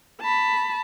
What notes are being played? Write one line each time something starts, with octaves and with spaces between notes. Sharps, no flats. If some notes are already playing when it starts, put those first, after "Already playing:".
A5 B5